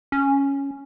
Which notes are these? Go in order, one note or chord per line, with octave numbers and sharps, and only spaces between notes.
C#4